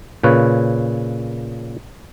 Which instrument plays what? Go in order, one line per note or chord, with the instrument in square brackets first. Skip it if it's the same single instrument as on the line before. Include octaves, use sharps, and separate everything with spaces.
[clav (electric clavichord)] A#2 C#3 B4 C#5